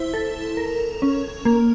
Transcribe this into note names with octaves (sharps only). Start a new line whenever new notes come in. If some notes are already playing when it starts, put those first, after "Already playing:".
Already playing: E4 C5
A4
A#4
C#4
A#3